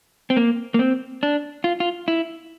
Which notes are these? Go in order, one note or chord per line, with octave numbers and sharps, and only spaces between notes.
C4
A#3
A#3
C4
D4
F4
F4
E4